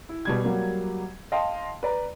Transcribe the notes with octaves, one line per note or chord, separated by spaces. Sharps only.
E4
B2 G3 G#6
F#3 G3 A#3
D#5 F5 G5 A5 C6
B4 D5 A#5